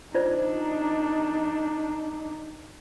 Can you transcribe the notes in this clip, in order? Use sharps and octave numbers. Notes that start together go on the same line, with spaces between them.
D4 D#4 F4 C5 D5